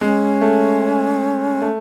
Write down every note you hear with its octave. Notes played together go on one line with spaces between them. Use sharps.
G#3 C#4
A3
A3 C#4